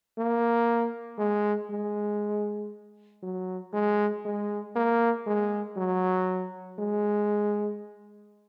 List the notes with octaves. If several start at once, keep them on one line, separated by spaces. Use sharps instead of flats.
A#3
G#3
G#3
F#3
G#3
G#3
A#3
G#3
F#3
G#3